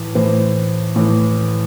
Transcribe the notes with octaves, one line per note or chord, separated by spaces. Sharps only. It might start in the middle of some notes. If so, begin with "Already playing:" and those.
Already playing: A2 E3
A2 E3 C5
A2 E3